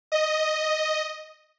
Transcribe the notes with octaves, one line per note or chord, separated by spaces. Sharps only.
D#5